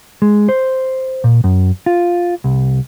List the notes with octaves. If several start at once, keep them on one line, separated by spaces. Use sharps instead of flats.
G#3
C5
A#2
F#2
F4
C2